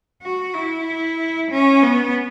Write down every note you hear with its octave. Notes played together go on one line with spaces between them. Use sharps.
F#4
E4
C#4
B3